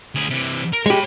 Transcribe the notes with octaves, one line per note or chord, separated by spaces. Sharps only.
D2 G#4
C3 E3
A#4
G#3 G4 C#5 B5